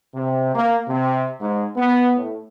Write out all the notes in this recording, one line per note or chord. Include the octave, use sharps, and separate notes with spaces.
C3
A#3
C3
G#2
B3
A2